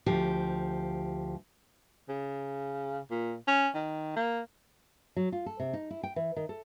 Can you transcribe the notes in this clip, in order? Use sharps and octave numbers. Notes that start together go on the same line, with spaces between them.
D2 F3 G4
C#3
A#2
C#4
D#3
A#3
F#3
F4
A4
C3
D#4
E4
G5
E3
D#3
A4